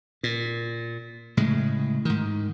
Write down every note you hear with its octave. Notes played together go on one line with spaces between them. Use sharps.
A#2
A2 C#3 G#3
G#2 D#3